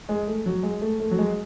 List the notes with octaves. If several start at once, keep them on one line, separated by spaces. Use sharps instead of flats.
G#3
A3
F#3
G#3
A3
A3
F#3
G#3